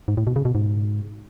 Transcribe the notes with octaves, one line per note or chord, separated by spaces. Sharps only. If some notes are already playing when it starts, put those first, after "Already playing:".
G#2
A2
B2
C#3
B2
G#2